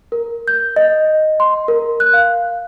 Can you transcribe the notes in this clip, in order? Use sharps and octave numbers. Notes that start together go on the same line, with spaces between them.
A#4
G6
D#5
C6
A#4
F#6
F5